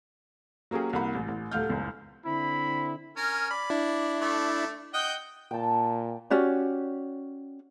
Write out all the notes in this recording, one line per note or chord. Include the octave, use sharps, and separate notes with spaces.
F#3 A#3 C#4 G4 G#4
C2 A#3 F#5 B5
A1
A1
D#1 D2 A3 F5 F6 G6
F#1 C#2
D3 C4 E4 B5
C#4 A#4 G#5
D5 B5
D4 E4
A3 D6
D#5 F#5 G5
A#2 G5 A5
C#4 F#4 G4 D5